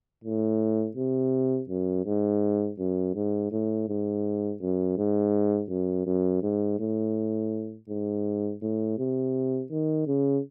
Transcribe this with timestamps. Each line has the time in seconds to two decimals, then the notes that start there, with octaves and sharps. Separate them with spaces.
0.24 A2
0.97 C3
1.69 F#2
2.06 G#2
2.79 F#2
3.15 G#2
3.52 A2
3.88 G#2
4.61 F#2
4.98 G#2
5.70 F#2
6.07 F#2
6.43 G#2
6.80 A2
7.89 G#2
8.62 A2
8.98 C3
9.71 D#3
10.07 C#3